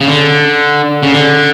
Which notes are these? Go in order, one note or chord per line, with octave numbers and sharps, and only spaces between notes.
C#3
D3
C#3
D3